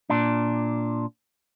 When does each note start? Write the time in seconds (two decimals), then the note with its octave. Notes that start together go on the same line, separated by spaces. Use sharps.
0.10 A#2 D4